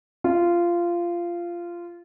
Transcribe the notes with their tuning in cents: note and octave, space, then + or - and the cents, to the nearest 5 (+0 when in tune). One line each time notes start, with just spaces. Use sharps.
F4 -15